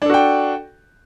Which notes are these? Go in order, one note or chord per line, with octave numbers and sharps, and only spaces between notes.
D4 F#4 A4 G5